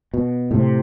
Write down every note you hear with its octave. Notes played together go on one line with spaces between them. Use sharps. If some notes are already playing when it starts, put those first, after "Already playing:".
B2
A2 C3